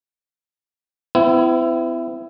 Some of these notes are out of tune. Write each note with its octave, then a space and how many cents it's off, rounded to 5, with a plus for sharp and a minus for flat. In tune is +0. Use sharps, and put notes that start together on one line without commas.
C4 -45 E4 +15